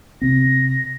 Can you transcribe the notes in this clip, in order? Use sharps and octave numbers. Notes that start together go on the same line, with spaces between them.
C3 C4 A#6